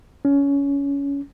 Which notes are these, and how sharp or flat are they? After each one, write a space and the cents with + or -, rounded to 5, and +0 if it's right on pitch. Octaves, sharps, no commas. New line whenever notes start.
C#4 +20